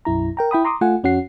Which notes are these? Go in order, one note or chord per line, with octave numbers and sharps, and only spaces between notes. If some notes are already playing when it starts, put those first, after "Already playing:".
B1 F#2 E4 A#5
A#4 G5 A#5
E4 G5 B5 D#6
A#5 C6 D6 D#6
A3 F4 F#5 G#5
F2 C#4 F#4 F#5 C7